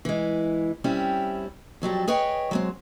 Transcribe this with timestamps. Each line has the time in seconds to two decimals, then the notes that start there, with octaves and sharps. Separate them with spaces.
0.05 E3 G#3
0.84 G3 C4 C#4 E4
1.82 F2 F#3 G3 A4
2.08 G#4 B4 C#5 D#5 G5
2.51 F#3 G#3 C4